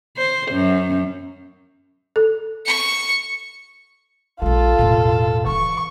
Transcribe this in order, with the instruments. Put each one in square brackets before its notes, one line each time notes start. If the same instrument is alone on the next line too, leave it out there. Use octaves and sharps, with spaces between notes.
[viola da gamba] C5
F#2
[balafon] A4
[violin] C#6 C#7
[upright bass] A#1 G#3 [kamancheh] F4 A4
[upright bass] E1 A2
[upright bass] E3 B3 [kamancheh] C#6